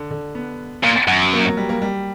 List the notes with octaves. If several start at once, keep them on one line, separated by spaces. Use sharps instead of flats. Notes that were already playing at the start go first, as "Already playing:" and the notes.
Already playing: D3
D3
B3
A#2
F#2
A#3
F#3
G3
A#3
G3